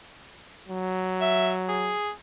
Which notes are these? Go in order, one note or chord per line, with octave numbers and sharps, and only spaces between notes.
F#3
E5
G#4